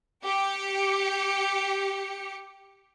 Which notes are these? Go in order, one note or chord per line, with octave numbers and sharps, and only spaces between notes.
G4 C#7